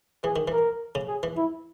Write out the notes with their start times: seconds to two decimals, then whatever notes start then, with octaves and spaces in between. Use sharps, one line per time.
0.24 E3 G#4
0.36 D#3
0.48 E3
0.53 A#4
0.95 C#3
1.08 G#4
1.23 E3
1.37 E4